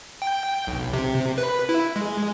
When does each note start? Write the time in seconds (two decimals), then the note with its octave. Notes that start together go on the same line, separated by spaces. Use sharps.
0.22 G5
0.67 B1
0.93 C3
1.38 B4
1.69 E4
1.96 G#3